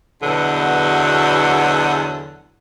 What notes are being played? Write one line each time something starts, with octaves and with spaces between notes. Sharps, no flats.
E2 B2 D3 F#3